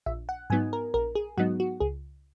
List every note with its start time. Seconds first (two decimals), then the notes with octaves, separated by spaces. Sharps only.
0.06 A#1 E5
0.29 F#5
0.50 G#2 F#3 B3 D#4 G#5
0.73 A#4
0.94 A#1 A#4
1.15 G#4
1.37 G#2 F#3 B3 D#4 F#4
1.60 F#4
1.80 C#2 G#4